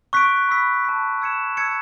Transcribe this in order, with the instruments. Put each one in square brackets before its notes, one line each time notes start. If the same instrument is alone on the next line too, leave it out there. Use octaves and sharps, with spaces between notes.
[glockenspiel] C#6 F#6 B6 D7
B5 E6 B6
A5 E6 B6
E6 G#6 C#7 E7
A5 E6 G#6 C#7